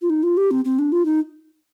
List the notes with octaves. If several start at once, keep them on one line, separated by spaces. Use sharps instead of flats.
F4
D#4
F4
G4
C4
C4
D4
F4
D#4